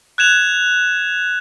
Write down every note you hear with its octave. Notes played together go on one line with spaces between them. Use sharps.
F#6 G#6 E7 F7